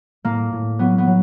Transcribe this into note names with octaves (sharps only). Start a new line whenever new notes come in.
A2 A#3
A2
F#3 B3
B3
F#3